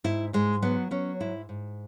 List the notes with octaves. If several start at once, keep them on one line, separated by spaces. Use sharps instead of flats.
G#2 E4
G#2 G#3
F#3 B3
F#3 C#4
G#2 E4
G#2